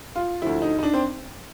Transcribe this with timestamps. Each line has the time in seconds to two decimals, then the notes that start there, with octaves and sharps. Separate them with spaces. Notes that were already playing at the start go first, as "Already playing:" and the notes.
0.16 F4
0.42 D2 D3 F3 E4
0.62 D#4
0.79 D#4
0.83 D4
0.94 C4